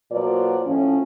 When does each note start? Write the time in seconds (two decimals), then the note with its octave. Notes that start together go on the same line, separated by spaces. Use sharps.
0.12 B2 F#3 A#3 F4 C5 D5
0.66 A2 F3 A3 C#4